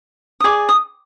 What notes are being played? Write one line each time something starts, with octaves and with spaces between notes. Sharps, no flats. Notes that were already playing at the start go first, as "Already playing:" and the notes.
D#6
G#4 D5 D6
D#6